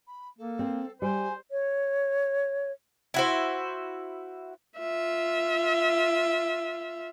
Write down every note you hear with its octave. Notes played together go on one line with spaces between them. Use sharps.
B5
A#3 A4
C4
G3 C5 G#5
C#5
E4 F#4 C5
F4 E5